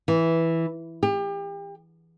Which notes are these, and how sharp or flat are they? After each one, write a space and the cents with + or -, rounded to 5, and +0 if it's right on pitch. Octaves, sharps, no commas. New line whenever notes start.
E3 -5
G4 +35